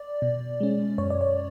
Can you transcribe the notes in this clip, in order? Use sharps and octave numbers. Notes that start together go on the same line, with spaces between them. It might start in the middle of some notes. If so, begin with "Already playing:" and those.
Already playing: D5
B2
G#3 C#4
F#2 C#5
D5
C#5